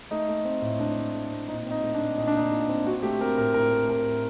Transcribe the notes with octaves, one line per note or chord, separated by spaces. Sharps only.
A3 D#4
A3
C4
A2
A2 D4
A2
A3
C4
A#2 D#4
C4 D#4
A3
D4
A#2
A#2 D#4
D4
A#2 D#4
A#2
C4
C4 F#4
A3 G4
C4 A#4
A2 A#4
A2 A#4
A3
A2 A#4
A2